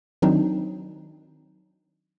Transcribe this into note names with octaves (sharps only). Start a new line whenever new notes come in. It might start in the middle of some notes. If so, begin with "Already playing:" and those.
D#3 F#3 C4 D4 D#4